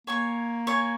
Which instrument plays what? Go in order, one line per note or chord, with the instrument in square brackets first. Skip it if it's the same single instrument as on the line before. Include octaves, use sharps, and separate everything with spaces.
[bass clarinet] A#3 [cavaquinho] C#5 G#5 C#6
[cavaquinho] C#5 G#5 C#6